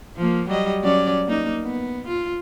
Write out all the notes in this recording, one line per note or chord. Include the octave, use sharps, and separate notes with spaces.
F3 A#3
F#3 G3 D#5
F#3 C#4 D5
A#3 D#4
B3
F4